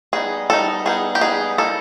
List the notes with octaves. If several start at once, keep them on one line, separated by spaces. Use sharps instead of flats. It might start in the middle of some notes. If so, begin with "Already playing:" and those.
G3 B3 D#4 G#4
G3 B3 D#4 A4
G3 B3 D#4 G#4
G4
G3 B3 D#4 G#4
G3 A#3 D#4 A4